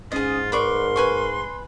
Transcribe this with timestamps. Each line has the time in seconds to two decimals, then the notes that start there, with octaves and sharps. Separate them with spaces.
0.12 G#2 C#4 F4 G#4 D#5
0.52 A#4 B4 D5 C6 C#6
0.96 B4 G#5 C#6